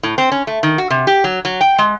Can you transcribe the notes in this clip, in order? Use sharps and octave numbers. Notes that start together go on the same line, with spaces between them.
A2
C4
C#4
A3
D#3
F#4
C3
G4
F#3
F#3
G5
G#3